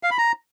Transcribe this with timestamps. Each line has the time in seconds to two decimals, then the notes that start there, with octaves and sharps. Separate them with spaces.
0.03 F5
0.11 B5
0.18 A#5